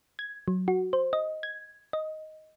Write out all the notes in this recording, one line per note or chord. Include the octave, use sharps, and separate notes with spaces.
G#6
F#3
F#4
C5
D#5
G#6
D#5